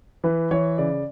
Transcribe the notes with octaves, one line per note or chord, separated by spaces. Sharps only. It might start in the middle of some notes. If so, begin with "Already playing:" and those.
E3 B4
E3 C#5
C#3 D5